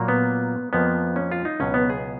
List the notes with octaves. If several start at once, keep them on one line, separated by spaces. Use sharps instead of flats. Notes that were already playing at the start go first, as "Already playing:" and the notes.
Already playing: A#2 F#3 A#3
B3
F2 F3 A#3 B3
C#4
F4
D#4
C#2 B2 F#3 C#4
B3
G#4